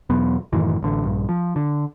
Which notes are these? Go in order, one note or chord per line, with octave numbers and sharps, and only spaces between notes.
E2 B2 F#3 B3
F#2 A2 D#3 E3
A1 D3
A#1 G2
F3
D3